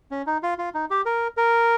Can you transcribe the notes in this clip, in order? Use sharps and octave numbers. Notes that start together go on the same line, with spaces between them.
C#4
D#4
F4
F4
D#4
G4
A#4
A#4